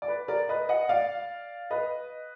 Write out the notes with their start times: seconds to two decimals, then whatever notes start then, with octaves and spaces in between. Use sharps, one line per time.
0.02 D5
0.08 B4
0.28 A#4 D5
0.49 B4 D#5
0.69 D#5 F#5
0.89 D5 F5
1.71 B4 D#5